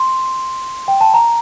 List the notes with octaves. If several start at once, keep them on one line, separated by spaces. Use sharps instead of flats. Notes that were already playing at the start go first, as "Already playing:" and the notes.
Already playing: C6
G5
A5
A#5